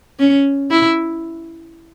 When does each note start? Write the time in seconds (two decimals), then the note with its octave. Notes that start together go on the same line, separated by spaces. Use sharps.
0.19 C#4
0.71 E4